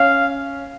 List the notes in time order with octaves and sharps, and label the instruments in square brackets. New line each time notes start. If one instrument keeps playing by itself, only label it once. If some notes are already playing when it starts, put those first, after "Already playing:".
Already playing: [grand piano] C#4 [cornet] F5